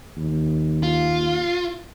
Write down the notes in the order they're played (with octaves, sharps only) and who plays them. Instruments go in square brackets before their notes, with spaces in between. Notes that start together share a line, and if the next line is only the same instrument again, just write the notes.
[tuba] D#2
[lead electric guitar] F4